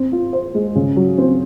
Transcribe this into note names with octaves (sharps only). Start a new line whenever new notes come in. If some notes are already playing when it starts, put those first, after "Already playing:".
Already playing: C4
F4
C5
G#3
C#3
F#3
C4